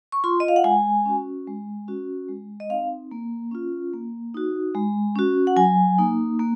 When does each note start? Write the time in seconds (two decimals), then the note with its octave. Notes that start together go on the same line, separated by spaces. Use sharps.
0.12 C#6
0.24 F4 C6
0.40 D#5
0.48 F5
0.56 F#5
0.64 G#3 G#5
1.06 C#4 F#4
1.47 G#3
1.88 C#4 F#4
2.29 G#3
2.60 D#5
2.70 C4 D#4 F5
3.11 A#3
3.51 C#4 F4
3.93 A#3
4.34 D#4 F#4
4.75 G#3
5.16 C#4 F#4
5.47 F#5
5.56 F#3 G#5
5.98 A#3 D#4
6.39 A#3